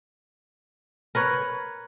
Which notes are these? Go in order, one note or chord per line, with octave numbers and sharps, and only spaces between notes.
A#4 B4 C#5